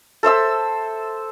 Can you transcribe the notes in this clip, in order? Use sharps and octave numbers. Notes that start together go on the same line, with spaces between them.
A4 C5 E5 E6